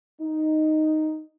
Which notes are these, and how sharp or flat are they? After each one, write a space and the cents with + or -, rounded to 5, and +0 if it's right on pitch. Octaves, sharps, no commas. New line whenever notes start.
D#4 -5